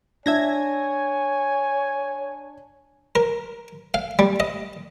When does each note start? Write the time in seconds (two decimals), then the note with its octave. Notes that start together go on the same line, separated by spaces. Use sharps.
0.26 D4 C#5 E5 G#5 G#6 A#6
3.15 A#4
3.94 F5
4.19 G3
4.40 D#5